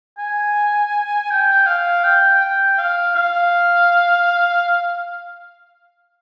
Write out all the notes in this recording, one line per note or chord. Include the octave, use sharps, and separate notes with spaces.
G#5
G5
F5
G5
G5
F5
F5